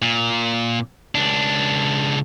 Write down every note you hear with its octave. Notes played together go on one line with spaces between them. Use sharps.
A#2
C#2 D4